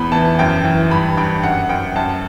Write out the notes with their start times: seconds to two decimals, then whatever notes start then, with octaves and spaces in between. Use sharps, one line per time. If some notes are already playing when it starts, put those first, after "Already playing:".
Already playing: E2 B5
0.12 E3 A5
0.39 F#2 G5
0.64 E3
0.90 G2 B5
1.17 G2 G5
1.43 F#2 F#5
1.69 F#2 G5
1.95 F#2 A5